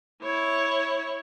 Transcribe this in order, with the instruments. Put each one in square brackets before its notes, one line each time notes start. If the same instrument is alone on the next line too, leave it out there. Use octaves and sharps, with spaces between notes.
[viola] E4 C#5